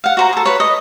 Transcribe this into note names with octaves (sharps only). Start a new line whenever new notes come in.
F5 F#5
F#4 C5 A#5
G#4 A4
B4 C#5
D#5